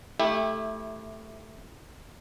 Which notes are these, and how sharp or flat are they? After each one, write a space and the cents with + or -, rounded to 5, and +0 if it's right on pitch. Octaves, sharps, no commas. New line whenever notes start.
A3 +0 E4 -10 G4 +15